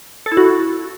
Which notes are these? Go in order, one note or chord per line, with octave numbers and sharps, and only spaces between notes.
A4
E4
F#4